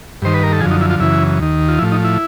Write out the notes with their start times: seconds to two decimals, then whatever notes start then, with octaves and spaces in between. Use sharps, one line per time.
0.22 G2 D#3 C5
0.34 B4
0.43 A#4
0.53 A4
0.61 F#2 D3 F3 G#4
0.71 D#4
0.81 E4
0.90 F4
1.00 F#2 C#3 E3 E4
1.39 D#2 D#3
1.68 F4
1.79 F3 E4
1.82 A2
1.92 D#4
2.04 E4